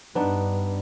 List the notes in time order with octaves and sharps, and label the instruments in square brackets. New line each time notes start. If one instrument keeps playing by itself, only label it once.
[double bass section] G2 [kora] B3 D4 D#4